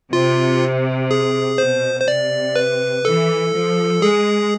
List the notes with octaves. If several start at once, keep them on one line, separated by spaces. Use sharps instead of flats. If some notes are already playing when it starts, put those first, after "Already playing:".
C3 F4
G#4
B2 C5
C5
C3 D5
B4
E3 A4
F3
G#3 G#4